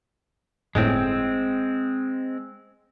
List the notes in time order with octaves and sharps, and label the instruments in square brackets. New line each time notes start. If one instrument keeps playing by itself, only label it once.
[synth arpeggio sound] G1 A2 [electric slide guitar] G#3 C4